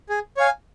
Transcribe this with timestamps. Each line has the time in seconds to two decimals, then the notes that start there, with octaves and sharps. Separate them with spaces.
0.09 G#4
0.37 C#5 F5 G#5